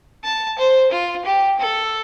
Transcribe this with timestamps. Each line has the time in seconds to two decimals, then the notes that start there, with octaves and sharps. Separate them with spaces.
0.24 A5
0.58 C5
0.92 F4
1.25 G4
1.59 A4